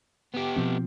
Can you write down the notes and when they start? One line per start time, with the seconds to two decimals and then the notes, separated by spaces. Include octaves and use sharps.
0.34 B3 G4
0.56 B2 F3 C4